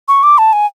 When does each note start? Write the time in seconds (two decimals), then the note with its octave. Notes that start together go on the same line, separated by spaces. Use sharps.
0.08 C#6
0.23 D6
0.38 A5
0.53 G#5